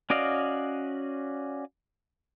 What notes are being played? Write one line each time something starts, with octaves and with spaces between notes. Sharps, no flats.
C#4 F#4 D5 D#5 F5